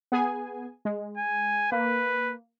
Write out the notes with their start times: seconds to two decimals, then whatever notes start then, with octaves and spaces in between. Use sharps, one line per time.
0.12 B3 G#4 G#5
0.85 G#3
1.18 G#5
1.72 A#3 B4